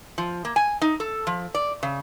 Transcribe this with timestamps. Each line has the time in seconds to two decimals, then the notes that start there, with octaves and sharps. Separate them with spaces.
0.18 F3
0.45 A#3
0.56 G#5
0.82 D#4
1.00 A4
1.27 F3
1.55 D5
1.83 C#3